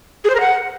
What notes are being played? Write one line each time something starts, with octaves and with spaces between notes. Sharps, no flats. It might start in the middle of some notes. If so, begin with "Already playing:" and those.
G#4
C5
A#4
F#5